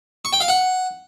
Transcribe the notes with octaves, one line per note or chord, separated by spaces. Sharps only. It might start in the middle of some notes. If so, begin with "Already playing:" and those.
C#6
G5
F5
F#5